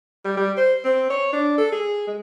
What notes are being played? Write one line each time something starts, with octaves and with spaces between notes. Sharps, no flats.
G3
G3
C5
C4
C#5
D4
A4
G#4
G#3